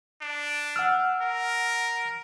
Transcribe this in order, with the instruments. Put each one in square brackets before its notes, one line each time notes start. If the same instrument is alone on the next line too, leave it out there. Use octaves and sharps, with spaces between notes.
[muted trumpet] D4
[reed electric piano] F#5 E6 F6
[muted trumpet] A#4